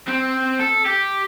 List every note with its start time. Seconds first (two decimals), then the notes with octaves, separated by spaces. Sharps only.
0.07 C4
0.59 A4
0.85 G4